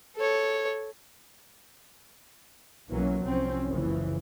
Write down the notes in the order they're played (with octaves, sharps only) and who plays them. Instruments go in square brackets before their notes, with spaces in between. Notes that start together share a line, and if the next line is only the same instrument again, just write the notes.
[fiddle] A4 C#5
[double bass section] B1 E3 F#3 A#3 C#4
C2 F3 C4 C#4
F#1 C#3 E3 F3